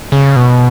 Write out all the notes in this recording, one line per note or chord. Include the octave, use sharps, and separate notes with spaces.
C#3
B2